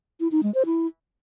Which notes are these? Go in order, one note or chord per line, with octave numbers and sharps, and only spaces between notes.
E4
D#4
G#3
C5
E4